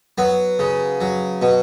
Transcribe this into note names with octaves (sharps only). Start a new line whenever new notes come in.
F#3 B3
C#3
F#3
B2